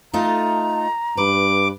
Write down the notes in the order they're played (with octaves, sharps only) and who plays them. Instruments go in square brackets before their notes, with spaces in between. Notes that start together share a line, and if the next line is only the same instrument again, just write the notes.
[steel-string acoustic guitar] A3 D#4 F4 [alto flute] A#5
[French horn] G2 [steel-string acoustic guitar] B4 [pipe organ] D6